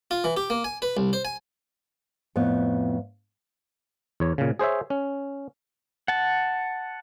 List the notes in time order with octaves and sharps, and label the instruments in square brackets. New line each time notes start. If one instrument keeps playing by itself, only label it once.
[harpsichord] F4
E3
G4
A#3
G#5
B4
C2
C5
G#5
[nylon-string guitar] F2 A2 B3
[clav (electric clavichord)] E2 C#5
A#2 C#3
G#4 C5 C#5 E5
C#4
[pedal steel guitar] F#5 A5